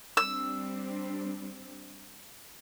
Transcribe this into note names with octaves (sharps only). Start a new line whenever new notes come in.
G3 C4 D4 E6